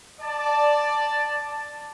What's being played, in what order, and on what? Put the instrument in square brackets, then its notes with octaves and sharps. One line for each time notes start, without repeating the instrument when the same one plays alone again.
[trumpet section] D5 A5